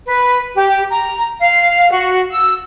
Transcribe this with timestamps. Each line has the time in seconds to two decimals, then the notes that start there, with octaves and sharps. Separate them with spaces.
0.06 B4
0.54 G4
0.89 A#5
1.40 F5
1.91 F#4
2.31 E6